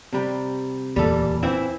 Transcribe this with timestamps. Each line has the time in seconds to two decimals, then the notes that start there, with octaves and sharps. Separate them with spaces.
0.13 C3 G3
0.96 D1 E2 A#2 G3 A4
1.43 E3 C4 E4